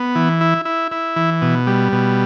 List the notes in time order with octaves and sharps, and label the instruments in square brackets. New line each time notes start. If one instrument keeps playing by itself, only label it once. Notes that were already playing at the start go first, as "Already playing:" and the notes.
Already playing: [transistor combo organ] B3
E3
E4
E4
E4
E3
B2
G3
B2